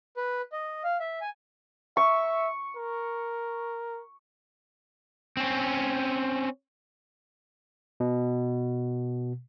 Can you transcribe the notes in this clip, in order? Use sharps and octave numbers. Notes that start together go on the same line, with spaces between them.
B4
D#5
F5
E5
G#5
E5 C#6
A#4
C4 C#4
B2